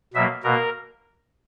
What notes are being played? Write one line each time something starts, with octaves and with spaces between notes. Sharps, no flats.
B2 F#3 A#3 E5
B2 A#3 A#4